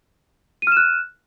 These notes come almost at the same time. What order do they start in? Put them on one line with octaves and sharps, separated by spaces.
D#7 F6 E7 F#6